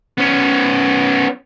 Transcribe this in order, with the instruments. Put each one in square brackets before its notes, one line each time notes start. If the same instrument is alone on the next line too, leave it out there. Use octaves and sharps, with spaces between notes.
[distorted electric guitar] B3 C#4